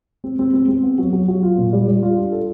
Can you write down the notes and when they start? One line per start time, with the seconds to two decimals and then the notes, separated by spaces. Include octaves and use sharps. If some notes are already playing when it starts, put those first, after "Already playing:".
0.24 C4
0.39 C4
0.54 C4
0.68 C4
0.83 B3
0.98 F#3
1.13 F#3
1.28 F#3
1.43 F4
1.58 A#2
1.73 G3
1.88 G3
2.03 F4
2.18 D4
2.32 A4